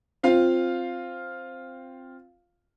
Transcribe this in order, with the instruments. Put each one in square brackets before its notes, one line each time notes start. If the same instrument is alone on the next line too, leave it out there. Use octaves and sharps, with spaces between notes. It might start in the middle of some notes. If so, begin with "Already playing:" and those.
[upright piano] C4 F4 F5